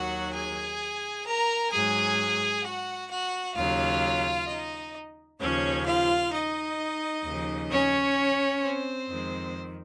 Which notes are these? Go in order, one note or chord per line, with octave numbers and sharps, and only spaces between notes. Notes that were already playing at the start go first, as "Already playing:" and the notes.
Already playing: D#2 D#3 F#3 F#4 F#5
G#4 G#5
A#4 A#5
G#2 F#3 G#4 G#5
F#4 F#5
F#4 F#5
D#2 C#3 F#3 F4 F5
D#4 D#5
D#2 C#3 F3 C#4 C#5
F4 F5
D#4 D#5
D#2 C#3 F3
C#4 C#5
C4 C5
F2 D#3 G#3